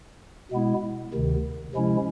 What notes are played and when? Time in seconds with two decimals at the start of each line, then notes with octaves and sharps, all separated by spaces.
0.51 B2 G#3 B3 E4
1.13 D2 C3 D#3
1.74 C3 F3 G#3 C#4 E4